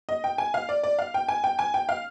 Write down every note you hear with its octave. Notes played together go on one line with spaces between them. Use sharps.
D#5
G5
G#5
F5
D5
D5
F5
G5
G#5
G5
G#5
G5
F5